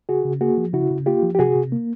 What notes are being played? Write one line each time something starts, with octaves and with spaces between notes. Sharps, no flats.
C#3 F#4 G#4
C#3
A#3 F#4 G#4
F3
C#3 E4 F#4
C#3
A#3 F4 G4
F3
G4
C3 F#4 G#4
C3
A#3